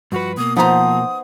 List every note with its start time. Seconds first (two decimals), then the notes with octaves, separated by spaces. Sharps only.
0.12 G2 F3 F#4 B4
0.37 B2 A#3 D#6
0.57 F3 B3 D#4 C5 A#5 D#6